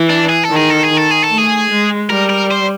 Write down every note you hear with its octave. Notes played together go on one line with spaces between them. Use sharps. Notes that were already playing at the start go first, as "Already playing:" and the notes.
Already playing: E3
D4
G#4
A4
D#3
G#4
A4
G#4
D#3
A4
G#4
A4
A3
G#4
G#3
G3 A#4
A#4
C5